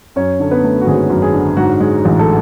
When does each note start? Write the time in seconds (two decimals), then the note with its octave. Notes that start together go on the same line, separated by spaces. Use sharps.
0.16 F#2 C#4 C#5
0.40 D3 A4
0.51 B3 B4
0.64 A3
0.81 F#4
0.87 G#1 G#4
1.10 F#2
1.22 G#4
1.33 D3
1.57 G#2 F#4
1.80 G#3
2.05 A1
2.19 A4